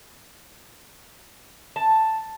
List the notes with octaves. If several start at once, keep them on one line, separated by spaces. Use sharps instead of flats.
A5